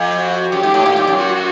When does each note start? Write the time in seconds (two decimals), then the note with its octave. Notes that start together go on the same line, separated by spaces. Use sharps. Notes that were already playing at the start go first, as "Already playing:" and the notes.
Already playing: F2
0.19 F#4
0.52 F#2 G4
0.63 G#2
0.74 A2
0.86 A#2
0.96 G#2
1.07 F#2
1.18 F#4